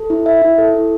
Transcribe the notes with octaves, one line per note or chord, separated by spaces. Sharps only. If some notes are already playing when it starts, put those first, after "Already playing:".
Already playing: A4
E4
E5
E4
A4
E4